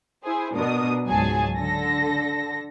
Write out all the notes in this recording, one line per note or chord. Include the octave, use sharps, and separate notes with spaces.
E4 G#4 C5
B2 D4 A#4 D#6
C#2 G#2 F#3 G#4 G#5 A5
D3 A4 A#6